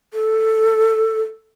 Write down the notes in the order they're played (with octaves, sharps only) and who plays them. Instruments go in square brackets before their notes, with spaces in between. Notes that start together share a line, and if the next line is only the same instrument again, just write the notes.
[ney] A4